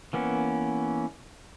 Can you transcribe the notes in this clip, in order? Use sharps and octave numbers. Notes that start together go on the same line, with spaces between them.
E3 A#3 B3 C#4